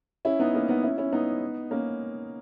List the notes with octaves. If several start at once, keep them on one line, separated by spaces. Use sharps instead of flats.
C#4 E4
B3 D#4
A#3 C#4
B3 D#4
C#4 E4
C#4 E4
B3 D#4
A#3 C#4